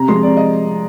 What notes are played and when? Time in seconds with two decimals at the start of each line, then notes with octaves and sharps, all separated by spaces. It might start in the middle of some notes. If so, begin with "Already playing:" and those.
Already playing: C3 A#5
0.08 F3 G#3 C6
0.23 C3 D5
0.37 D#5